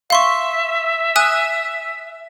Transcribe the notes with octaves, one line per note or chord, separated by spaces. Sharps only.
E5 F5 C6 C#6
G#5 D#6 F#6